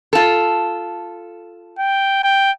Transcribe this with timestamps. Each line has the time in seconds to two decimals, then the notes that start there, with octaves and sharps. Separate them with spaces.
0.13 F4 A4
1.79 G5
2.24 G5